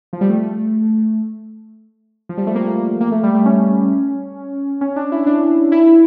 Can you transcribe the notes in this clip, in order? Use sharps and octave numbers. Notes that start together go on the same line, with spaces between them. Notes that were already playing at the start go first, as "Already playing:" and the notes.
F3
G3
A3
F3
G3
A3
A#3
A#3
A3
G3
A3
C#4
C#4
D4
E4
D4
E4